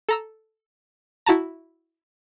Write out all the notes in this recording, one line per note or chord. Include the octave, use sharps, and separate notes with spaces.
A4 A#5 E6
E4 F#4 A5 A#5